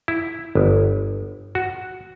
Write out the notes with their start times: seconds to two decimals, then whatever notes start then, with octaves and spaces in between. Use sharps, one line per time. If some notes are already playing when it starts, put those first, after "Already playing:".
0.08 E4
0.55 G1
1.55 F#4